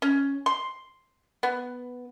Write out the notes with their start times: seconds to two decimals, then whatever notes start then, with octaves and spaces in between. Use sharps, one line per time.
0.02 C#4
0.46 C6
1.43 B3